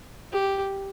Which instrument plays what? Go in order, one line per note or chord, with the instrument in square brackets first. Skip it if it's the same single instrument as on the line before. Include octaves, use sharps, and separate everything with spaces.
[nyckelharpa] G4